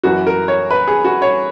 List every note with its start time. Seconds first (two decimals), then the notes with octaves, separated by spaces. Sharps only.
0.03 F#1 F#2 E3 F#4
0.27 A#4
0.48 C#5
0.71 B4
0.87 G#4
1.04 F#4
1.22 C#5